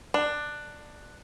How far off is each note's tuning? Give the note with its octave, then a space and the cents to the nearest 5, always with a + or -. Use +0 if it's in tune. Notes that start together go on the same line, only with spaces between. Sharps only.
D4 +15